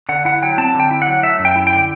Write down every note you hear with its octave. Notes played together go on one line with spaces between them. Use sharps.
D3 F#5
E4 F#5
F#3 G5
C4 A5
D3
G5
E4
F#3 F#5
A3 E5
F#2
G5
E4
G5
D3